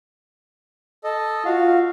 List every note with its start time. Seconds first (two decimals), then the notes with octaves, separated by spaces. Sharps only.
1.04 A4 D#5
1.45 F4 F#4 F5